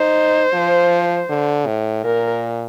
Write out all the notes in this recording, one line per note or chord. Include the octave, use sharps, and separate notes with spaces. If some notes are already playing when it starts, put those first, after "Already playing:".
Already playing: D#4 C5
F3
D3
A2
A#2 A#4